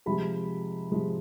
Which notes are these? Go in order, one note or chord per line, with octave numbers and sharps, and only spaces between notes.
C3 F3 G#3 B5
C3 F3 G#3